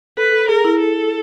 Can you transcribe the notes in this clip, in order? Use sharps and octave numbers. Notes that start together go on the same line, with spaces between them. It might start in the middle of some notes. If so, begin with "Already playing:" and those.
A4 B4
A4
G#4 A#4
E4
A4